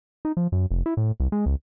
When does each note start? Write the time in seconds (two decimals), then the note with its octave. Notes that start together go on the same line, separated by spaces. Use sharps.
0.25 D#4
0.37 F3
0.52 F#2
0.71 F1
0.86 E4
0.97 A2
1.20 C2
1.32 G#3
1.46 C#2